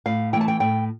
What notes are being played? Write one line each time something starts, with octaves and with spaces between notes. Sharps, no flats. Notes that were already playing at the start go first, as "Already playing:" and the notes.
A2 F5
E3 A3 G5
A5
G5
A2 G5